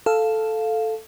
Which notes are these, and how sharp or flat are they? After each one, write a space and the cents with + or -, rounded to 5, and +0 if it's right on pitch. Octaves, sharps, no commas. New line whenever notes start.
A4 +0 F5 +0